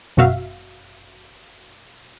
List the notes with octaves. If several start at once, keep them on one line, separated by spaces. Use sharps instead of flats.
G1 F#2 B2 F#4 E5 F5